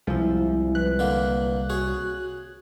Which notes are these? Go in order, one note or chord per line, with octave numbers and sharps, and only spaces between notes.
C2 C3 F3 G#3 E4
B4 F#6
D3 A#3
F#4 G#4 C#5